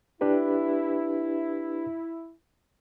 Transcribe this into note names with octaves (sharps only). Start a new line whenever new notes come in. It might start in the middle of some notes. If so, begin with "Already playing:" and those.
D4 E4 G4 B4